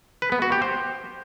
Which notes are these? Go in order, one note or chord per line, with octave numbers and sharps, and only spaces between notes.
B4
B3
F#4
G4
C5